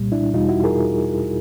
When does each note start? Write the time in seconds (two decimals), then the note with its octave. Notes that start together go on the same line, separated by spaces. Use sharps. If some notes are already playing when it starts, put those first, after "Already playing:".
Already playing: C2 A#2 G3
0.12 D4 E4
0.34 E2 B2 G3 D#4 F4
0.49 E4 F#4
0.64 G#4 A#4